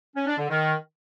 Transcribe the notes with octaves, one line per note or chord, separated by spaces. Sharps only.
C#4
D4
D3
D#3